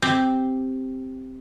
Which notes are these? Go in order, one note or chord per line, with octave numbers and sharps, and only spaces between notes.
C4 G4